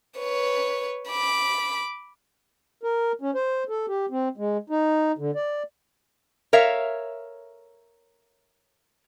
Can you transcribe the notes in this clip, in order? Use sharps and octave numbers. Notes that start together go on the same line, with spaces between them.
B4 C#5
B5 D6
A#4
C#4
C5
A4
G4
C4
G#3
D#4
D3
D5
A#4 C#5 E5 F5